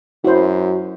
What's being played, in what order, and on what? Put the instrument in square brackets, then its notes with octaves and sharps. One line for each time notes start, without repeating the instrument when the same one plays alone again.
[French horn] F#2 [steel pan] E4 C5 [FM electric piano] F#4